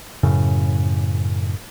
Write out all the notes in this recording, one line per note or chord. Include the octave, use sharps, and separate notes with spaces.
F#2 A2 C#3